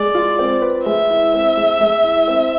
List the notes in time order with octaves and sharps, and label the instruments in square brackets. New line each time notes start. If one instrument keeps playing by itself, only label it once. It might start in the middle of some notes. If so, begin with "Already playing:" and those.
Already playing: [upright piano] G#3 [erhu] D5
[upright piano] F4
C4
B4
[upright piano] G#3 [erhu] E5
[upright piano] E4
C4
G#3
G#3
E4
C4